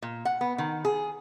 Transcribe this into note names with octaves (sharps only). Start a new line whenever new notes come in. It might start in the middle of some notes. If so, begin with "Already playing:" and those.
A#2
F#5
B3
D#3
G#4